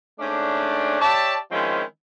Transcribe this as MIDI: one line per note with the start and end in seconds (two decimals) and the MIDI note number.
0.20 1.00 44
0.20 1.00 57
0.20 1.00 61
0.20 1.00 62
1.01 1.37 67
1.01 1.37 73
1.01 1.37 74
1.01 1.37 76
1.01 1.37 81
1.52 1.82 51
1.52 1.82 53
1.52 1.82 56
1.52 1.82 60
1.52 1.82 61
1.52 1.82 64